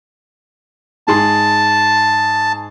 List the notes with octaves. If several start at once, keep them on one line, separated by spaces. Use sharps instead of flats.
G#2 G#4 A5 C6